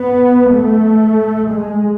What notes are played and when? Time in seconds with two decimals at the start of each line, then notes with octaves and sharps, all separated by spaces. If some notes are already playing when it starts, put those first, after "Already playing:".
Already playing: B3
0.54 A3
1.52 G#3